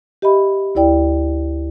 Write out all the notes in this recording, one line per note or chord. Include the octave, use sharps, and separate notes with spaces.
G4 D#5 E5 B5
D2 E4 D5 G5